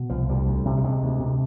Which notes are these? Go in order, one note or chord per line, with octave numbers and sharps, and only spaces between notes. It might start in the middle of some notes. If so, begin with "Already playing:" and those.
Already playing: B2
C2 F3
D2 G3
D2
C3
G3
C3 G#3
D2
C3